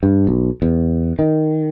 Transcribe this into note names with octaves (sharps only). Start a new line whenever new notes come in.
G2
B1
E2
D#3